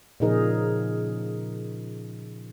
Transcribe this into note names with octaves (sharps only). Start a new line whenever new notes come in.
A#2 C#3 F3 D#4 G#4 A#4